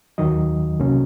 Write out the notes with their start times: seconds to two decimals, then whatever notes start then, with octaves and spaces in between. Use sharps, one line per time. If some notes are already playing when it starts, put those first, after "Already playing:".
0.18 D#2 D#3 F#3 D#5
0.80 C2 C3 F#3 A#3 C#4